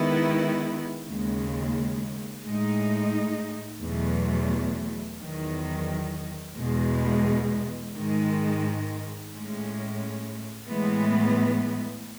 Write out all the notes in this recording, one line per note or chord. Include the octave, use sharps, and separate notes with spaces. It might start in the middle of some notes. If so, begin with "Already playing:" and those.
Already playing: D#3 G#3 B3 E4
D#2 C#3 G#3
A2 G#3 D#4
E2 B2 F#3 A3
E2 D#3 F#3
E2 B2 G#3
G#2 D#3 G#3
A2 G#3 C#4
A2 E3 G#3 B3